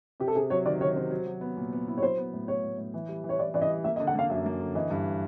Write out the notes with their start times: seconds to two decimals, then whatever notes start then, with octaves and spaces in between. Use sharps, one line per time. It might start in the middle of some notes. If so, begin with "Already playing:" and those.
0.20 C3 G4
0.28 A4
0.35 C3 G#4
0.50 F#3 C#5
0.66 D#3 D5
0.81 D#3 C#5
0.96 C3 C5
1.11 F#3
1.26 F#3
1.41 B3
1.57 A#2
1.73 B3
1.88 E4
1.98 C#5
2.03 F#3 C5
2.17 B3
2.33 A2
2.48 B3 C#5
2.64 A2
2.78 A2
2.94 E3
3.09 G3
3.24 E3
3.29 C#5
3.39 E3 D5
3.54 E3 D5
3.62 D#5
3.69 G3
3.84 A#3 E5
3.96 D#5
4.00 D3
4.07 F#5
4.15 A#3 F5
4.30 F#2 E5
4.46 A#3
4.60 D3
4.75 E3 D#5
4.90 G2